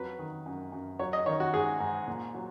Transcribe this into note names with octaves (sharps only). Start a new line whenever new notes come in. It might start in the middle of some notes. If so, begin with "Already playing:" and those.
Already playing: F2 F#3 B4
D#3
F#2
F#2
F#3 C#5
D#5
D#3 C#5
F#4
G#2 G#4
G#2
A#2
F#3